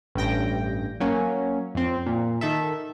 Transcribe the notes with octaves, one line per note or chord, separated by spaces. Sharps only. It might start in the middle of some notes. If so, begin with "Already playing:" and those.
A1 G2 G5 A#6
F#3 A#3 C#4
F2 C4
A#2
D#3 A4 E5